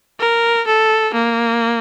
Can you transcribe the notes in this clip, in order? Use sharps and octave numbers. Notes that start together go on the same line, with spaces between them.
A#4
A4
A#3